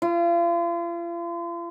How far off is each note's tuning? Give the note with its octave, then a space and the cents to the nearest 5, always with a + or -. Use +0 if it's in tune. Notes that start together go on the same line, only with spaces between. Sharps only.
F4 -40